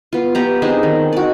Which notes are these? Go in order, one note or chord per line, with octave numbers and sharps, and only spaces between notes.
B3 F4
B3 G4 A#5
C4 D4 D#4 G#4
D#3
F#4 D5